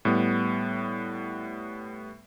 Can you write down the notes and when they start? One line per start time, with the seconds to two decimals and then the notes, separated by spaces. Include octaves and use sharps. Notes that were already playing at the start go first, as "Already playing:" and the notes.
0.05 A2 G3 B3